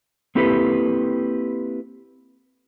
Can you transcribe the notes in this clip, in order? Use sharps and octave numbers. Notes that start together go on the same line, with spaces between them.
A#3 C4 E4 G4 A4 B4